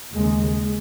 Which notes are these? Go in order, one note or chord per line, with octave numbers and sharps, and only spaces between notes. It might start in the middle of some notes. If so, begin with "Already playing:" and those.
D#2 C#3 G#3